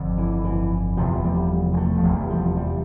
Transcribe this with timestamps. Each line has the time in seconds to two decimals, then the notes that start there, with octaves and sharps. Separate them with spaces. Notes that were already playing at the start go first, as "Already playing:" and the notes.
Already playing: G1 F2 D3
0.18 E3
0.45 E3
0.97 F1 E2 C3 F3
1.24 G3
1.74 G3
1.77 A3
1.98 F3
2.03 F1 E2 C3 G3
2.30 F3
2.57 G3